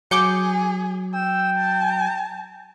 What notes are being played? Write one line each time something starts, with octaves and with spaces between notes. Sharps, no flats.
F#3 G#4 D6 G6 C#7
G5 E6
A5